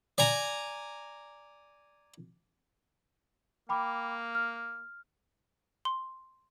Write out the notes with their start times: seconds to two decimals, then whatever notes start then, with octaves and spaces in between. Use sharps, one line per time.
0.18 D5 G#5 A#5
3.69 A#3 G5 B5 D6
4.35 F6
5.85 C6